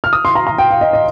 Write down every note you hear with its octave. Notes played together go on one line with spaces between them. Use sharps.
F6
D#6
C6
A#5
A#5
G5
F5
D#5
D#5